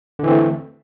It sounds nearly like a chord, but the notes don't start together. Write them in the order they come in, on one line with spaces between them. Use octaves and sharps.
D3 E3 C4 A3